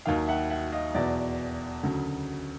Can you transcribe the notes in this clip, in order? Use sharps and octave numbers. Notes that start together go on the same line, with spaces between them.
D#2 D#3 F#3 F5 G5
E5 F#5
E5 F#5
D#5 F5
E2 B2 F#3 D5 E5
D2 C#3 F#3